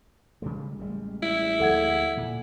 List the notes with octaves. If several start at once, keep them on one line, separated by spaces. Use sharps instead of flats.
C#3 G3 G#3
A1 G3 G#3
E4
D2 F3 A#3 A4 F#5 G#6
A#2